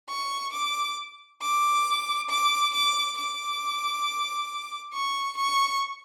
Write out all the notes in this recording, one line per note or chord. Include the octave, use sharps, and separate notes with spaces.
C#6
D6
D6
D6
D6
D6
C#6
C#6